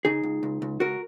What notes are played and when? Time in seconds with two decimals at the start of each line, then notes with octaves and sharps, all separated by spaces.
0.05 C#3 D#4 G#4
0.23 C#2
0.43 C#2
0.62 C#2
0.80 C#2 F#4 A#4